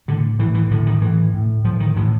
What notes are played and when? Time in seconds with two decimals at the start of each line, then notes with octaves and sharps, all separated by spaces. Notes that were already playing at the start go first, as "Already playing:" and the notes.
0.08 A2 D3
0.39 A2 E3
0.55 E3
0.71 A2 D3
0.87 D#3
1.02 A2 E3
1.34 A2
1.64 A2 F3
1.80 D#3
1.96 A2 E3